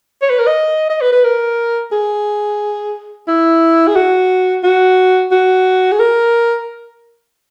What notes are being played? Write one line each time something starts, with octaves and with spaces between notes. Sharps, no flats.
C#5
B4
A#4
D#5
D#5
B4
B4
A#4
G#4
E4
G#4
F#4
F#4
F#4
G#4
A#4